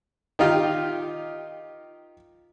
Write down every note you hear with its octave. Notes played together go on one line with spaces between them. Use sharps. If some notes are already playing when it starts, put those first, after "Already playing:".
D#3 D#4 F4 G4